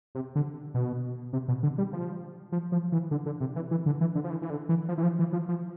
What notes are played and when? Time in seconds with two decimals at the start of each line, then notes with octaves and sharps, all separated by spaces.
0.15 C3
0.35 D3
0.74 B2
1.33 C3
1.48 B2
1.63 D3
1.78 G3
1.93 F3
2.52 F3
2.72 F3
2.92 E3
3.11 D3
3.26 D3
3.40 C3
3.56 E3
3.71 E3
3.86 D3
4.01 E3
4.15 D3
4.24 F3
4.30 E3
4.42 E3
4.50 D3
4.69 E3
4.88 F3
4.98 E3
5.03 F3
5.19 E3
5.33 F3
5.48 F3